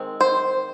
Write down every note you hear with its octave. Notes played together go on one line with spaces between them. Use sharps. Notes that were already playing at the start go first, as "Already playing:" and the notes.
Already playing: D#3 G#3 C4
C5